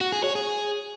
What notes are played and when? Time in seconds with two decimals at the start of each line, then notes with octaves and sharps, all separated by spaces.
0.01 F#4
0.12 G#4
0.24 C#5
0.35 G#4